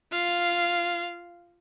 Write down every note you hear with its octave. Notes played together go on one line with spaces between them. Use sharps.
F4 F5